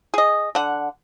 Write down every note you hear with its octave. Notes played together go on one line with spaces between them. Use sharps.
G#4 D#5
D3 F#5